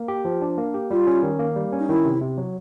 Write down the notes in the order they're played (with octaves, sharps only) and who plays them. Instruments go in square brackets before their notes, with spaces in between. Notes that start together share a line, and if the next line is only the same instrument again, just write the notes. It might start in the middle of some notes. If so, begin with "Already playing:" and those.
Already playing: [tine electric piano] A#3
G4
F3
D4
A#3
G4
[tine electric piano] G3 [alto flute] F4
[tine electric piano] C#4
D#3
A#3
G3
C#4
[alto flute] D#4
[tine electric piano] D#3 [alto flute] E4
[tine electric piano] C3
C3
F#3